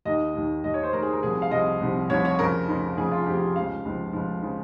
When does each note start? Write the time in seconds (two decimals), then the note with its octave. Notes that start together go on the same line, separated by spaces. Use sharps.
0.05 D#2 D#3 D#5
0.34 D#2 D#3
0.64 D#2 D#3 D#5
0.74 C#5
0.83 C5
0.93 D#2 A#4
0.97 D#3
1.03 G#4
1.13 A#4
1.22 C2 C3 F3 G#4
1.42 F5
1.51 C2 C3 F3 D#5
1.80 C2 C3 F3
2.10 C2 C3 F3 C#5
2.25 C#5
2.39 F2 C#3 F3 A#4
2.68 F2 C#3 F3
2.97 F2 C#3 F3 G#4
3.11 F4
3.27 F2 C#3 F3 G4
3.56 C#2 C#3 F3 F5
3.85 C#2 C#3 F3
4.13 C#2 C#3 F3
4.43 C#3 F3